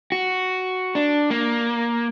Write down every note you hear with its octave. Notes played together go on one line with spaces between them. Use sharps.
F#4
D4
A#3